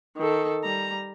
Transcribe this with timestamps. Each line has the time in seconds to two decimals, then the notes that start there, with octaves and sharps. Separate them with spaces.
0.18 D#3 A4
0.64 G3 A#5